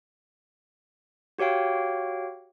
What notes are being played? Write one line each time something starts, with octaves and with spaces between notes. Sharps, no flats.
F#4 G4 C#5 F5 G5